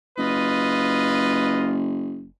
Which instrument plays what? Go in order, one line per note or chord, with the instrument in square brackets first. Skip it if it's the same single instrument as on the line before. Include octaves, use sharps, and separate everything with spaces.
[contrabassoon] F#1 [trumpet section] F4 B4 D#5